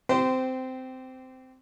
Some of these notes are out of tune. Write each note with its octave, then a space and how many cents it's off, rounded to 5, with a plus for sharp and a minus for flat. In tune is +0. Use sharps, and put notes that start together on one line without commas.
C4 -15 G4 -25 C5 -20